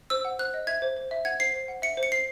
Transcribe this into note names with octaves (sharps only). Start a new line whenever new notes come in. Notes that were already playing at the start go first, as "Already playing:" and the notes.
C5 E6
F#5
C5 F#6
D#5
E5 G#6
C5
C5
E5
F#5 G#6
C5 C7
C5
F#5
E5 C#7
C5
C#7
C5 C7